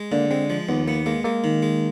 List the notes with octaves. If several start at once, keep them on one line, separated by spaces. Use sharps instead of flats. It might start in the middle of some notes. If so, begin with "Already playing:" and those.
Already playing: G#3
D3 A#3
G#3 C4
F3
D#2 B3
A#3 B3
G#3 A#3
G#3 A#3
D#3
G#3